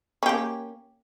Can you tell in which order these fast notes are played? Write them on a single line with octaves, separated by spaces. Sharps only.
C#4 G4 A#3